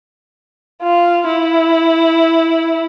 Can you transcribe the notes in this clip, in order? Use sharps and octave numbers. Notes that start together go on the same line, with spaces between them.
F4
E4